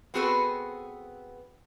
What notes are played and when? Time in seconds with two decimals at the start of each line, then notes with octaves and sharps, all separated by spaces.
0.14 B3 C4 F#4 G#4 A4 B4